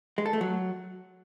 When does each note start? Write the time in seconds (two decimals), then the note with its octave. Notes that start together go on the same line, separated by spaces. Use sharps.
0.18 G#3
0.26 A4
0.33 A3
0.41 F#3